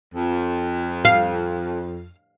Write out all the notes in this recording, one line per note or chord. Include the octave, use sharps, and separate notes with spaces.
F2
F5